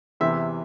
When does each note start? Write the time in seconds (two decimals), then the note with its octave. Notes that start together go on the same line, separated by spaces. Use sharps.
0.20 E2 C3 E3 E5